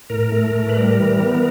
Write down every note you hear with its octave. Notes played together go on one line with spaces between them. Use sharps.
A2 A#4
A3
A2
B4
G3 A#4
E3
B3